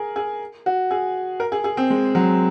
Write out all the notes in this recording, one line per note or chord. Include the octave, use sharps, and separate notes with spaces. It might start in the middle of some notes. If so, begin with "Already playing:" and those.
Already playing: G#4 A#4
G#4
F#4
G#4
A#4
G#4
G#4
C4
G#3
F#3